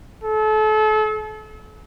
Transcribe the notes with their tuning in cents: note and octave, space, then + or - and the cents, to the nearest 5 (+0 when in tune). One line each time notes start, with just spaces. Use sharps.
A4 -35